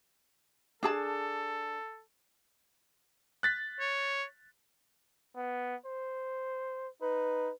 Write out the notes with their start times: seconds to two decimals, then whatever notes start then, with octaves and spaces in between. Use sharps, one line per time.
0.83 D4 G#4 A4 A5
3.43 F#6 A6 B6
3.80 C#5
5.37 B3
5.86 C5
7.02 D#4 B4